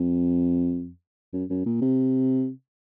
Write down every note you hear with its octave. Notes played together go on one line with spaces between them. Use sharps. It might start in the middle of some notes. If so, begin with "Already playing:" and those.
Already playing: F2
F#2
F#2
A#2
C3